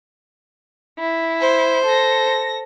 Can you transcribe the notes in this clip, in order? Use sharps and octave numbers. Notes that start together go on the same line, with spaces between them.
E4
C5
A4 A#6